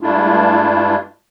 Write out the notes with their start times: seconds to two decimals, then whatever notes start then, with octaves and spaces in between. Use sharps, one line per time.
0.01 G2 G#3 A3 D4 E4 F4